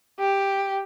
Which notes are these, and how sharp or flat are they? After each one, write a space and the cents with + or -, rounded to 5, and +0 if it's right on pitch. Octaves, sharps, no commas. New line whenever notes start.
G4 +5